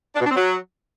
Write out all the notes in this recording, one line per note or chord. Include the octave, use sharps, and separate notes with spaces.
D4
B2
D4
C4
F#3